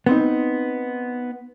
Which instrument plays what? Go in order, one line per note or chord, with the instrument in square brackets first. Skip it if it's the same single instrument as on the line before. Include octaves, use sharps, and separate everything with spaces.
[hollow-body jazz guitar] B3 C4 D#4